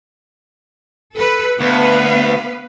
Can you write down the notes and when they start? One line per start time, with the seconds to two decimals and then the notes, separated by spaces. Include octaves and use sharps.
1.15 A4 B4
1.61 D2 B3 B4 F5